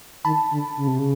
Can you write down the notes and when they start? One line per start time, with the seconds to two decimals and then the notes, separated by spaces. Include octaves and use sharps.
0.24 D#3 A5 B5
0.51 D3
0.77 C#3
0.87 C3
0.99 C#3